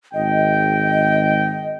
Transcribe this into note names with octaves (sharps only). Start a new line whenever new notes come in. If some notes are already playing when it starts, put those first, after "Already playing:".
G#1 D#5 G5